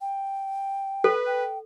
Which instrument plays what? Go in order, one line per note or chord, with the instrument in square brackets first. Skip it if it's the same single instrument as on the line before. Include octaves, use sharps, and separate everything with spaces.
[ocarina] G5
[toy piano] A4 [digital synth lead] B4
[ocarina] G5